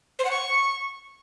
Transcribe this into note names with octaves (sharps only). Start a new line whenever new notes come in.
C5
F#5
C#6